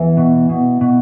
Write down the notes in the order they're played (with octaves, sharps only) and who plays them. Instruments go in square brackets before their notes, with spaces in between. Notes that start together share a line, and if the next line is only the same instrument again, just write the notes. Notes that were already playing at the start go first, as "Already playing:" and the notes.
Already playing: [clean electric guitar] E2 [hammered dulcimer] E3
[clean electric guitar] B2
B2
B2